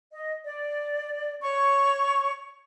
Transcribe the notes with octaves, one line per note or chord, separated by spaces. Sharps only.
D#5
D5
C#5 C#6